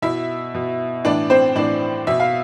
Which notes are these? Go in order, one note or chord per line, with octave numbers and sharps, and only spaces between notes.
B2 E4 E5
B2
A2 E3 D4 D5
C4 C5
A2 E3 D4 D5
B2 E5
F5